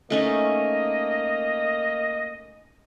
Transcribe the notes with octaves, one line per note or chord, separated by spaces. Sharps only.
A3 A#3 C#4 D#4 D#5